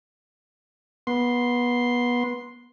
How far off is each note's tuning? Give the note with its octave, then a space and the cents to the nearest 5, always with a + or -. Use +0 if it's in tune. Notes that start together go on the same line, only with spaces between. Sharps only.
B3 -20 C6 +0